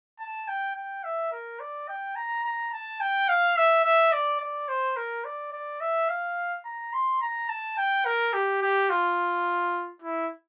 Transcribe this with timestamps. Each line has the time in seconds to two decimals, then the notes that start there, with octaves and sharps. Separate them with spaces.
0.20 A5
0.48 G5
0.76 G5
1.04 E5
1.32 A#4
1.60 D5
1.88 G5
2.16 A#5
2.44 A#5
2.73 A5
3.01 G5
3.29 F5
3.56 E5
3.84 E5
4.12 D5
4.40 D5
4.68 C5
4.96 A#4
5.25 D5
5.53 D5
5.81 E5
6.09 F5
6.65 A#5
6.93 C6
7.21 A#5
7.49 A5
7.77 G5
8.06 A#4
8.33 G4
8.62 G4
8.90 F4
10.02 E4